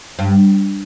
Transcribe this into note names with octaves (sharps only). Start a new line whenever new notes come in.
G2